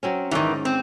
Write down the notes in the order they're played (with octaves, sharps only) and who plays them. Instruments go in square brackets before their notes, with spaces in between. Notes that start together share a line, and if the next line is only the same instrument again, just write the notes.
[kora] F#3 C4 C#4
[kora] G#2 C#4 D5 [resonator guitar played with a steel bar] D#3 E3
[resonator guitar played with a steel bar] C4